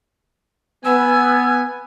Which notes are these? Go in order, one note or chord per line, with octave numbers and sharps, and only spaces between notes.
B3 G#5 E6